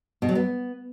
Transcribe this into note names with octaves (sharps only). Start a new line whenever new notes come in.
B2
F#3
B3